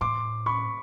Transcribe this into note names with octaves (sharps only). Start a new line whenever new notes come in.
A2 C6 D6
B5 C#6